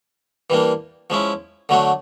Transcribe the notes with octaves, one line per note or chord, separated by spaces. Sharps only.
E3 G3 A#3 D4
F3 G#3 C#4 E4
D3 F#3 A3 D4